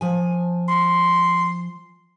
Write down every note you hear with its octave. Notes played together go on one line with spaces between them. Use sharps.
F3 G#5
C6